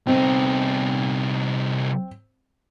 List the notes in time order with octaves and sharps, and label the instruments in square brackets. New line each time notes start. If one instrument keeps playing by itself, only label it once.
[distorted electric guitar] C2 D#4 [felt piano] C4